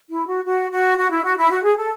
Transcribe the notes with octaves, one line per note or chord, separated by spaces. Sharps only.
E4
F#4
F#4
F#4
F#4
E4
F#4
E4
F#4
G#4
A4